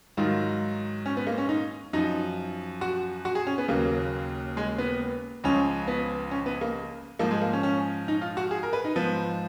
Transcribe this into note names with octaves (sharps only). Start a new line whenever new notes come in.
G#2 D#3 F#3 F4
C#4
B3
A#3
C#4
D#4
F#2 F3 D#4
F#4
F#4
G#4
C#4
B3
D#2 C#3 F#3 A#3
G#3
B3
C#2 C#3 F3 C#4
B3
C#4
B3
A#3
G#2 F3 A#3
G#3
A#3
C#4
C#4
D#4
F4
F#4
G#4
A#4
B4
D#4
G#2 F3 B3